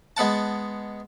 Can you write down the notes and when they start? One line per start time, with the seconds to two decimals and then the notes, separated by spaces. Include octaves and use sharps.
0.17 G#3 B3 F#5 A5